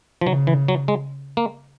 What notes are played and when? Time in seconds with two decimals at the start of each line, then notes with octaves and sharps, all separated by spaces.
0.21 F3
0.27 C#3 F#3
0.47 E3
0.68 F#3
0.88 G#3
1.37 A#3